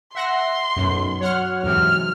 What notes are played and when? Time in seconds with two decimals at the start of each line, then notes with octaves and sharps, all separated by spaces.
0.15 E5 F#5 C6 A#6
0.76 B1 F#2
1.21 F#3 C#5 F#5 F6
1.63 E2 G#2 C3 F6